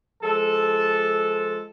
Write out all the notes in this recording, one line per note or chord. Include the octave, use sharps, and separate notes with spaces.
F3 G#3 A4